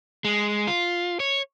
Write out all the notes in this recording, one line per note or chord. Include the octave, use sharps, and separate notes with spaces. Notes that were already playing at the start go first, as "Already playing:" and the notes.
G#3
F4
C#5